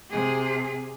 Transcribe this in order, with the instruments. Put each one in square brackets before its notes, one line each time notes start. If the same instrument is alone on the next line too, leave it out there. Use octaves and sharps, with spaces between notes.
[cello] C3 G#4